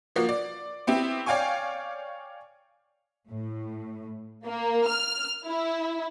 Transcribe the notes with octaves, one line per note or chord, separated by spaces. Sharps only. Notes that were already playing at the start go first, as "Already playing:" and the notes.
F3 A#3 F#4
D5
B3 C4 E4 G4
C#5 D5 F5 G5 G#5 C#6
A2
A#3
F6
E4